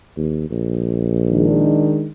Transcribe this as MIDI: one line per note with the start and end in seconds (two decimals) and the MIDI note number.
0.17 0.50 39
0.50 1.95 34
1.30 2.08 51
1.30 2.08 56
1.30 2.08 62